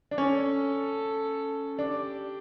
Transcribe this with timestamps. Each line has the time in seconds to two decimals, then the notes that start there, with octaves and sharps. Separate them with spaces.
0.11 D4
0.18 C#4 A4
1.79 D4 G4